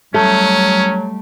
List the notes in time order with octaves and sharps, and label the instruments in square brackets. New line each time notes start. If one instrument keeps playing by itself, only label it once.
[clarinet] F#3 [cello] G3 [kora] A3 [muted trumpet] C#4